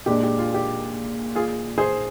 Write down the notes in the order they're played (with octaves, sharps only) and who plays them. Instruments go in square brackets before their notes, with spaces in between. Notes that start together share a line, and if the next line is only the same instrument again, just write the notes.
[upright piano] A#2 G#3 D4 [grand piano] G4
[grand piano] G4
F4
G4
F4 G#4
G#4 C5